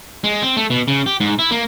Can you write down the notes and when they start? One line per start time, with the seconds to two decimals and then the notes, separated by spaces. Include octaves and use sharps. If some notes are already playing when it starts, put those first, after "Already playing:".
0.24 G#3
0.42 C4
0.57 A3
0.70 B2
0.88 C#3
1.06 G4
1.20 G#2
1.39 E4
1.51 A#3